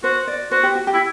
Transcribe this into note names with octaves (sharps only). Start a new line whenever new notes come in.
F#4 C5
D5
F#4 C5
G4
F#4
G4
E4